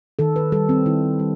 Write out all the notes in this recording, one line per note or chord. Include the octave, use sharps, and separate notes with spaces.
D#3 A4
B4
G3 A4
C4
D#3 E4
G3